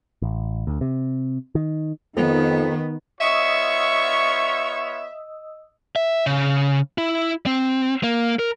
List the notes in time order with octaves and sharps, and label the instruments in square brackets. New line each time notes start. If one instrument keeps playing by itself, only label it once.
[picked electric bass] A1
D2
C3
D#3
[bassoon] F2 [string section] D#3 [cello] B3
[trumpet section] B3 F4 C#5 [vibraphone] D#5 D#6 E6 [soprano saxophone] E5 [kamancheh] C#6
[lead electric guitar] E5
C#3
E4
C4
A#3
A#4